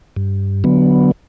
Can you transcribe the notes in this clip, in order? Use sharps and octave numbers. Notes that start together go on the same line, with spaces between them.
G2
D3 F#3 B3